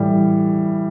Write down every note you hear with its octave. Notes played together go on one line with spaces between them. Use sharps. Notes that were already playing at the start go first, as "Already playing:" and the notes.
Already playing: A2 E3 G3